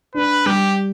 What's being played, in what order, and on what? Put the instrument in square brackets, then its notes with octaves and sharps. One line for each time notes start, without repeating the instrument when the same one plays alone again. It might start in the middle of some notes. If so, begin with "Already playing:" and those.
[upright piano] D4 [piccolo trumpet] B4
[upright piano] G3 [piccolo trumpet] G4